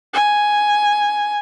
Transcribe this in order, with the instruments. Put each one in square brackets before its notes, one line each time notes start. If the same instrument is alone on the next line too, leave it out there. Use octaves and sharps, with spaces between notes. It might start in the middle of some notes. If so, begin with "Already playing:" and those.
[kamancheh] G#5